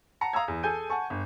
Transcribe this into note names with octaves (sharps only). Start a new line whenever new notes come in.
F#5 A5 A#5 A#6 C#7
F5 A#5 D#6 E6 G#6
E2
G#4 A4 G#5 G6 D#7
F#5 G#5 A5 C#6
G1